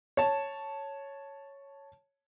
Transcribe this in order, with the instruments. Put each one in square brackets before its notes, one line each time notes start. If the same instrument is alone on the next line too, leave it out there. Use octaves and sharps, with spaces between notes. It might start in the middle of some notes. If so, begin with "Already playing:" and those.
[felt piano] C#5 A5